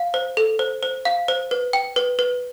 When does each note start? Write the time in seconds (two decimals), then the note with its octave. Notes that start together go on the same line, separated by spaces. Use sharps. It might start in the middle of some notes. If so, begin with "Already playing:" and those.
Already playing: F5
0.14 C5
0.37 A4
0.59 C5
0.83 C5
1.05 F5
1.28 C5
1.51 B4
1.73 G5
1.96 B4
2.19 B4